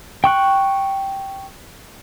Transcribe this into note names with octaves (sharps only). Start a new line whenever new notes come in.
G5 C#6 F#6